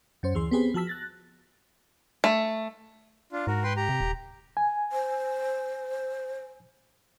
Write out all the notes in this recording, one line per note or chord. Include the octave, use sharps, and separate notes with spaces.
F#2 C#4 C5
D2 E3 G#4 C6
B3 C4 G4 G#4 B4 C5
F3 F#4 A5 E6 B6
F#6 A6 A#6
A3
D4 F4
G#2 F#4 A#4
B4 G5 C6
G4 A#5
C3
D#1
G#5
C5